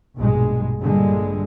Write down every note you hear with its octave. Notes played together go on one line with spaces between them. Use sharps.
A#1 G2 B2 G#3
A#1 G2 A#2 D3 G3 G#3